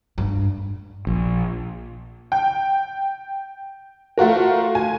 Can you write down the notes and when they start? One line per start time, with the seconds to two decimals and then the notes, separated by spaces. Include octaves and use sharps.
0.18 G2
1.07 A#1
2.32 G5
4.18 A3 F4 F#4 A#4
4.75 G#5